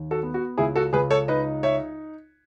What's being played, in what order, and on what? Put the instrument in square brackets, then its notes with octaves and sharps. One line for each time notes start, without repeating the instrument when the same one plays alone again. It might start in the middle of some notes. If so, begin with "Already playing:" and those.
Already playing: [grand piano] D#2
F#4 A4
B3
F#4
C#2 E4 G#4
F#4 A4
C#2 G#4 B4
A4 C#5
D#4 B4 D#5
C#5 E5